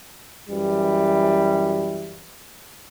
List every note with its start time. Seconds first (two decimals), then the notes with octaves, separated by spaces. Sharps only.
0.49 F#2 E3 G3